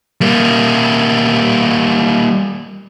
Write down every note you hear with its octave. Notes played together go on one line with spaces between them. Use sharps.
G3 A#3